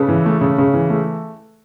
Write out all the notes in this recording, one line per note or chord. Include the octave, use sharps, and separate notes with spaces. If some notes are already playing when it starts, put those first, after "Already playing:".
Already playing: C#3 A4 B4
E3
A3
C#3
C#3
E3
A3